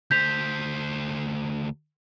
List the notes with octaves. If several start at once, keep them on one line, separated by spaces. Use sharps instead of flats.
D2 C5 G6 B6 F7